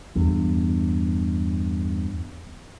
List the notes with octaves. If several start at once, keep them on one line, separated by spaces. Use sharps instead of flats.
E2 G2